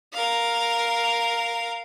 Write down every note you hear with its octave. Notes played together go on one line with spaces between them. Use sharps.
A#4 F5